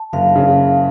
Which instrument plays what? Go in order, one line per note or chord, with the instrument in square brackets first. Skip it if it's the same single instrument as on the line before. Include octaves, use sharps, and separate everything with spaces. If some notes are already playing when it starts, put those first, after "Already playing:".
Already playing: [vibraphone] A5
[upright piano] F#1 [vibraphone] F5
[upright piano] C#3